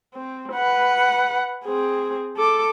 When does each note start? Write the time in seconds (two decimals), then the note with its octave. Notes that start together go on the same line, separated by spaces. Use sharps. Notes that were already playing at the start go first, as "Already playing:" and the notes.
0.14 C4
0.53 B4 F#5
1.65 C4 G#4
2.37 A4 D6